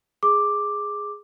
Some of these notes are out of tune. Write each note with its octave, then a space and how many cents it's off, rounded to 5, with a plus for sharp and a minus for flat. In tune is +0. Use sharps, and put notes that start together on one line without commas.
G#4 +0 D6 +5